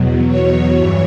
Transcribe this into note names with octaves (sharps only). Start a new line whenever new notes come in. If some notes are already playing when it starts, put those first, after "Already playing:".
Already playing: E2 B2 F#3
C#5
G2 E3 C#5